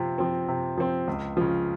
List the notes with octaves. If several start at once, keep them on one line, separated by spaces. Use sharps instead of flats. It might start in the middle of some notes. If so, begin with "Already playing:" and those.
Already playing: C3 F3 C4
F3 C4
C3
F3 C4
C#2
C#3 F3